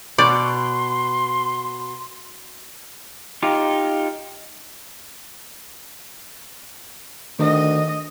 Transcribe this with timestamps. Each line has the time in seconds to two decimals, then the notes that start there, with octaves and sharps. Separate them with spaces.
0.18 B2 D5 C6
3.43 D#4 F4 G4
7.39 D2 D#3 D#5